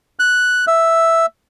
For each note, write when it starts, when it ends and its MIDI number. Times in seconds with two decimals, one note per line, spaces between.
0.19 0.65 90
0.67 1.26 76